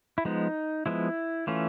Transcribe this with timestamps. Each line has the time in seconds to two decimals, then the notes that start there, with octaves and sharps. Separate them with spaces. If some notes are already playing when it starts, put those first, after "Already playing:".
0.18 E4
0.25 F3 G#3 B3 D#4
0.86 F3 G#3 B3 E4
1.47 E3 A3 C#4 F4